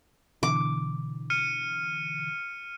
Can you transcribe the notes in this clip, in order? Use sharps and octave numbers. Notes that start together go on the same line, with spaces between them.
B2 D3 E3 D6
F6 C#7 D#7